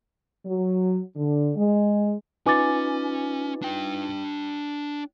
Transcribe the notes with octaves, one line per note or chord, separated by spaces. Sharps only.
F#3
D3
G#3
C#4 D#4 F4 B4 G#5 D6 A6
D4 G5